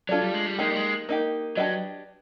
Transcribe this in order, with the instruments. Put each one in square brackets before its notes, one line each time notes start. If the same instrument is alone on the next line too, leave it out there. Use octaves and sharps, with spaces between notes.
[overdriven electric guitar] F#3 [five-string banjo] D4 F4 A4 D5
[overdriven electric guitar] G3
G#3
G3
[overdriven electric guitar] G#3 [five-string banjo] A#3 D#4 G4
[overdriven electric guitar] G3
G#3
[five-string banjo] A#3 D#4 G4
[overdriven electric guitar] F#3 [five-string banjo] D4 G4 B4 D#5